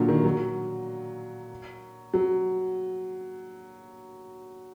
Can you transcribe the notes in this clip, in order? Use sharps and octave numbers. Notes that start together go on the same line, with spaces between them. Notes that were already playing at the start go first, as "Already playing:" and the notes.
Already playing: A#2 D3 F#3
D#3
F#3
F#3